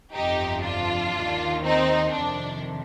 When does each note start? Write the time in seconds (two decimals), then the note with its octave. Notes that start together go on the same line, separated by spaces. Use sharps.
0.14 G1 F2 C3 F3 D#4 G4
0.64 D4 F4
1.14 D#2 D#3
1.64 C4 D#4
2.14 F2 C3 D#3 D4